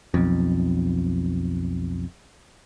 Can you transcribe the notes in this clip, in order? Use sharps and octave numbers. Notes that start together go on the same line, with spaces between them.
B1 F2